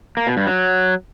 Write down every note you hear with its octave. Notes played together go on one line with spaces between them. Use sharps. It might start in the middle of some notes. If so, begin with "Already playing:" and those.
A#3
B2
G2
F#3